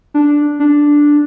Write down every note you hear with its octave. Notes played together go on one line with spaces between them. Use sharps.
D4
D4